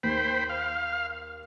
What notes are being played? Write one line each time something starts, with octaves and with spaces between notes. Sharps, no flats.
D#2 C5 G5 B5
F5